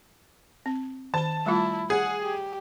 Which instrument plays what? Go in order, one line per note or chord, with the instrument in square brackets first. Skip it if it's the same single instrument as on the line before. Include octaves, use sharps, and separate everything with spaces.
[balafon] C4
[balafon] D#3 B5 [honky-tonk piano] A5
[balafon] G3 A3 F4 [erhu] E4
[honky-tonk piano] G#4 [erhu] F#5
[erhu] G4